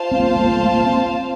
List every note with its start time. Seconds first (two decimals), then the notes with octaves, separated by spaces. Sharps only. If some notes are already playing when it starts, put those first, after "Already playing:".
Already playing: F4 C5 F5 A5
0.11 C4
0.20 A#3
0.36 A3
0.45 A#3
0.52 A3
0.63 A3
0.68 A#3
0.85 C4